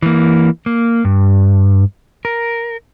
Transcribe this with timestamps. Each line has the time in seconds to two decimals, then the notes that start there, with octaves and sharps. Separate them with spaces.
0.02 E3 A#3
0.66 A#3
1.05 G2
2.25 A#4